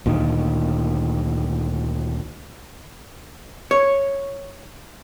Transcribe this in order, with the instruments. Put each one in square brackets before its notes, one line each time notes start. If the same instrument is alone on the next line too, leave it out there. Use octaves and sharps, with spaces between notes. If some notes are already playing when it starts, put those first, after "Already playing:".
[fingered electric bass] D2 A#2 D#3
[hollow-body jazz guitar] C#5